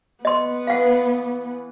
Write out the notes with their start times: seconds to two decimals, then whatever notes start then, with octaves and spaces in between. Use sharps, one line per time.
0.25 B3 D#5 C6
0.67 E3 B4 F5 F#5